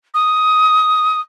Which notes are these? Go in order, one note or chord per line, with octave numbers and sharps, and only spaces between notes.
D#6